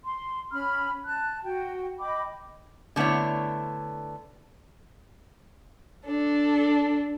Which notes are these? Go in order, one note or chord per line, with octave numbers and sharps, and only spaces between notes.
C6
C#4 B5 F6
A5 F#6
F#4 G5
D#5 G5 B5 D6
D3 A3 B3 E4 C#5
D4 A4